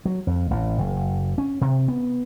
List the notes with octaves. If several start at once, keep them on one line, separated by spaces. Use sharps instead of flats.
F#3
F2
A1
F#1
C#4
C3
B3